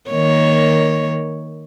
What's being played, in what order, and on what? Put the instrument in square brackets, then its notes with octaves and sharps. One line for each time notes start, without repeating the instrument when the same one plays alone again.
[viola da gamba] D#3 A#3 C#5